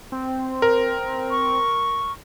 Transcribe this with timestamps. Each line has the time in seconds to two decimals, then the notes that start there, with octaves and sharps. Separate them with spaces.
0.12 C4
0.62 A#4
1.31 C#6